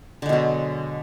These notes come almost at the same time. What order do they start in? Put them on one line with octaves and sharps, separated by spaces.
D3 G#3 B2 F#3